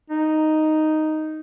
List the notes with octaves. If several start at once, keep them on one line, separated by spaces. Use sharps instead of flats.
D#4